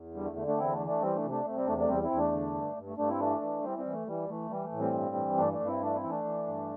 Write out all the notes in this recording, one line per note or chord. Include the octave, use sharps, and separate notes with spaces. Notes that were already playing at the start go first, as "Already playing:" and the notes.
Already playing: E2
D3 G3
A3
D3 A3
A3 D4
E2 C4 E4
A3 D4
E3
A3 D4
E3 G3 C4
A3 D4
C3
A3 D4
C3 A3
G3 C4
E2 A3 D4
A3 D4
E2 G3 C4
C4 E4
E2
A3 D4
D3
G2
G2
A3
G2 A3 D4
C4 E4
E3 A3 D4
E3
E3 G3 C4
G3 C4
E3
A3
E3 G3
E3 A3
E3 G3
A3
A2
G3 C4
G2
E3
G2 A3 D4
A3 D4
G2
C4 E4
E3 A3 D4
C4 E4
E3
A3 D4
E3
G2